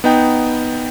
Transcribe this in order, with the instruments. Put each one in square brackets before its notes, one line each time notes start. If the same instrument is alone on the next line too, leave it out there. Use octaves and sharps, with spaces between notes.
[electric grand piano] B3 D#4 G5